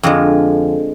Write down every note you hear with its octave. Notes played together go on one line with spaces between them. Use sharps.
F2 D3 F3 G#3